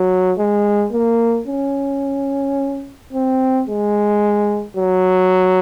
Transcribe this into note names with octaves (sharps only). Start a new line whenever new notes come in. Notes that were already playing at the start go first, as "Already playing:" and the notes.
Already playing: F#3
G#3
A#3
C#4
C4
G#3
F#3